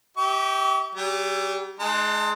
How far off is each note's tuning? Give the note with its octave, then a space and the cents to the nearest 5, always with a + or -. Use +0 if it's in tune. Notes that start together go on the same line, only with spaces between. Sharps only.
G4 -10 E5 -45 C#6 +45
G3 -35 G4 +40
G#3 +20 D#4 -40 A5 +35